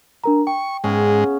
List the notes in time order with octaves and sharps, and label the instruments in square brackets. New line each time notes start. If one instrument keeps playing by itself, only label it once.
[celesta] D4 A#4 A#5
[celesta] G5 [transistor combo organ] C#6
[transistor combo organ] G#2 G#3 [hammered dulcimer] C#3 B3 C#4